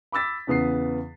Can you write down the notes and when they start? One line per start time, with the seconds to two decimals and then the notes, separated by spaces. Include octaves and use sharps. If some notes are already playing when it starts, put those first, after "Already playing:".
0.12 B5 D6 E6 A6 B6
0.47 E2 C#3 B3 D#6 C7